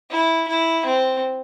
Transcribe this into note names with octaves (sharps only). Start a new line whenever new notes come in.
E4
E4
C4